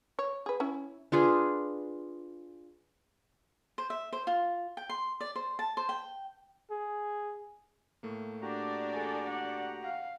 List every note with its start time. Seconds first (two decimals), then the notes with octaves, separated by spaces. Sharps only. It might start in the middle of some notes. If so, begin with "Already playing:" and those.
0.19 C#5
0.46 G#4 B4
0.60 C#4 E4
1.12 D4 F4 G#4 B4
3.78 C5
3.90 E5
4.13 C5
4.27 F4
4.77 G5
4.89 C6
5.21 D5
5.36 C5
5.59 A5
5.77 C5
5.89 G5
6.71 G#4
8.03 A2 A3 A#3
8.42 D4 F#4 G4 D5 A#5
8.93 G#4 A4
9.26 F#5
9.84 F5 F#5